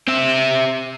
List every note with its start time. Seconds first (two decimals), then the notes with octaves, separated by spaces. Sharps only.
0.07 C4 E5